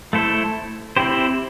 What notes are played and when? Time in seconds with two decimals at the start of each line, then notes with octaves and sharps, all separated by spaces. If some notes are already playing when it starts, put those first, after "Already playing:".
0.13 A3 E4 A4 C5
0.97 C4 E4 G4 C5